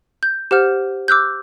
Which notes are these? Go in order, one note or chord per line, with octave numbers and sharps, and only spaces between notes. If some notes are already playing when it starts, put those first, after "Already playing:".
G6
G4 C5 F#5 F6 G6
D6 E6 F#6 G6